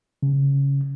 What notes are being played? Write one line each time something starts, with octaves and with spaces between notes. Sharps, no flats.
C#3